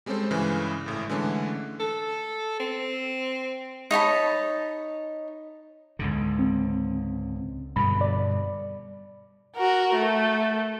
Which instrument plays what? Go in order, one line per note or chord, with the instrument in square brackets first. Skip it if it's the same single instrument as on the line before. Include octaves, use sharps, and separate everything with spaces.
[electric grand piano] G3 G#3 C4 C#4 A4 C5
G2 C#3 E3 G#3
G#1 A2
D3 E3 G#3 A3 C#4 D4
[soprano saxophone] A4
C4
[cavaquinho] D#4 C#5 A5 B5
[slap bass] C#2 G#2 D3
[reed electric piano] C4
[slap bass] G2 B2 D3 [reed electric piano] B5
[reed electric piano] D5
[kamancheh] F#4 A#4
A3